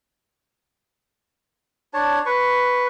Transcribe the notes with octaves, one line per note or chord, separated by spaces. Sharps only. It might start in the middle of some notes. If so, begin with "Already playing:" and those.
D4 C#5 A5
B4 C#6